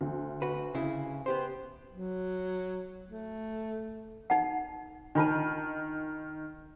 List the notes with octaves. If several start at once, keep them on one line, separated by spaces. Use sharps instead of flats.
D2
F#4 B4
C#3 E4
B3 G4 C5
F#3
A3
D#4 F#5
D#3 D4 F4 A5